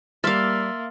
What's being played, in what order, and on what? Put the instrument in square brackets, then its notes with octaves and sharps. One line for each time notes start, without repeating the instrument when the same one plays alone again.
[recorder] G3 [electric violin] A#3 [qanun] E5 F5 [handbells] C6 F6 A6